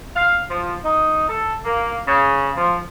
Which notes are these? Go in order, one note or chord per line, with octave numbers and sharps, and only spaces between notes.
F5
F3
D#4
A4
A#3
C#3
F3